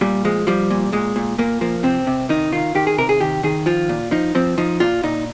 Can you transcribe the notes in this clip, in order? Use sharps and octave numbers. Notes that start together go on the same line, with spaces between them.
A#2 G3
F3 G#3
F3 G3
A#2
A#2 G#3
A#2
A#2 A#3
F3 A#3
C3 C4
C3
D#3 D#4
D#3 F4
D#3 G4
G#4
C3 A#4
G#4
D#3 G4
D#3 G#4
F3 F4
A#2
F3 D#4
F3 C4
F3 D#4
A#2 F4
A#2 D#4